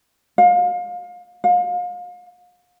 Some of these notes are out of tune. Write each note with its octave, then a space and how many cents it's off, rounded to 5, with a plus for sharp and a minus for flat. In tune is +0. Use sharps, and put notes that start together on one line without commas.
F5 +30
F5 +35